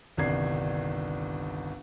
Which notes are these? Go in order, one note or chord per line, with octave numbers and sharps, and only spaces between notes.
G1 C2 D#3 D4 G#6 C7